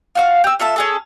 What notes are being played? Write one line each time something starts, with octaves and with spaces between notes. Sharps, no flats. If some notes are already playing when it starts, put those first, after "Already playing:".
F4 F#4 F5
G4 E6
F4 A4 E5 A5
C#4 G#4 A4